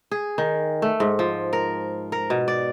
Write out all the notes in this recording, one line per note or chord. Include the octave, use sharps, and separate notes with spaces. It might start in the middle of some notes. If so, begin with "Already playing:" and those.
G#4
D#3
A3
G#2
F3
A#4
A#4
B2
D5